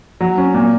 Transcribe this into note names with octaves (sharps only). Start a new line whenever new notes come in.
F#3
C#4
A#2